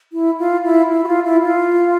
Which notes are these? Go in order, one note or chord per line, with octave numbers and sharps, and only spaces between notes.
E4
F4
E4
E4
F#4
F4
E4
F4